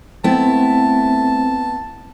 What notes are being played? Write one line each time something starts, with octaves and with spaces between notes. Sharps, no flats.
A3 B3 C4 E4 A5